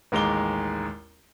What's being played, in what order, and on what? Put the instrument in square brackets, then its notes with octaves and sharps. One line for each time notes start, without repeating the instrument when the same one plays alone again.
[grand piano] A1 D#2 G#3 A#5 D6 G7